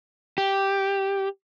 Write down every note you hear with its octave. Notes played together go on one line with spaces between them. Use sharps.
G4